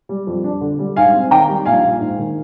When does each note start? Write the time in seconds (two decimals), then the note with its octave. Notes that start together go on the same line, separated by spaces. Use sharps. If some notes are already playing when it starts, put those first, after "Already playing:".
0.09 G3
0.27 F2
0.44 D4
0.61 D3
0.79 G3
0.96 G#2 F5 G#5
1.14 C4
1.31 D#3 G5 A#5
1.48 G3
1.66 A#1 F5 G#5
1.83 A#1
2.00 G#2
2.18 D#3